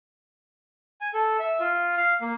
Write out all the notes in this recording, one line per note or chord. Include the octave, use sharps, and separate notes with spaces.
G#5
A4
E5
F4
F5
A#3